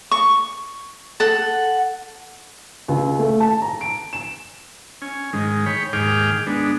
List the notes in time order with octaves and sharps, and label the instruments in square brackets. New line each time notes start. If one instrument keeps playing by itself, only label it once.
[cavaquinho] C#6
A4 F#5
[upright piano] C#2
A3
A5
A#5
D7
E7
[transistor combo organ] C#4 G#5
G#2 D#3 G#3
C#5 G5 B5
D#2 G#2 G#4 G5 D6 F6
G#3 B3 D4